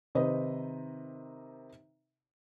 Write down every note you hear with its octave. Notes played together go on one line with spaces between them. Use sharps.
C3 D#3 B4 C5 D#5